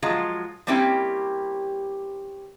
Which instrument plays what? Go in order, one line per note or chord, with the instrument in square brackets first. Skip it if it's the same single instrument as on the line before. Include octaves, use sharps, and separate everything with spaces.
[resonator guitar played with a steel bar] F3 F#3 G#3 F4 F#4
G3 A#3 C4 C#4 E4 G4